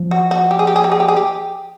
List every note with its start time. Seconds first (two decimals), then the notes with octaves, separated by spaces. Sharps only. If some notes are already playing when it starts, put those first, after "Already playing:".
Already playing: F3
0.11 F#4
0.31 F#4
0.51 G4
0.59 G#4
0.67 G4
0.76 G#4
0.84 G4
0.92 G#4
1.00 G4
1.08 G#4
1.16 G4